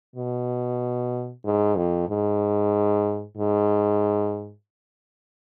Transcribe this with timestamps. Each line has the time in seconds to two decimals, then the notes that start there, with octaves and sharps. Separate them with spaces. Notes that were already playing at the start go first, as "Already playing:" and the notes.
0.16 B2
1.45 G#2
1.76 F2
2.09 G#2
3.37 G#2